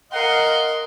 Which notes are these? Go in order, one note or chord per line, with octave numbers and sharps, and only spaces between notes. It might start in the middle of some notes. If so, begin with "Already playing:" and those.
A#4 D#5 F5 F#5 C6